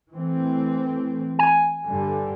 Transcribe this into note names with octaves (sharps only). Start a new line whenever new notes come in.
E3 A3 C4
G#5
G2 D3 G3